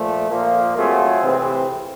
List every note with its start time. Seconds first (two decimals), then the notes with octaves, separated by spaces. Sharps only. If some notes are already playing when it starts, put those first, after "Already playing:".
Already playing: A#2 F3 A3
0.30 A#2 F3 A#3
0.76 F#3 A3 C4 F4 G#4
1.22 C3 E3 A3 C4